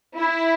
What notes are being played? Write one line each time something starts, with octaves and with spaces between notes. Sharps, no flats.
E4